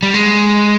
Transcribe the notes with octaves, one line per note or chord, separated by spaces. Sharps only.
G3
G#3